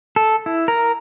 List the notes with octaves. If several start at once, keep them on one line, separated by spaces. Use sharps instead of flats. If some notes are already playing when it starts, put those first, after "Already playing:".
A4
E4
A#4